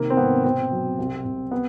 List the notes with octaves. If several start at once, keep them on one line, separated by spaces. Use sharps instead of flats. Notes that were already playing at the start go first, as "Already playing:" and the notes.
Already playing: C3 D#3 A#3
C4
G#1 B3
B2 C4
F#3
C2
C2
B3